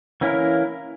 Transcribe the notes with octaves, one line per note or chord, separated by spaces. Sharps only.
E3 A#3 C#4 E4 A#4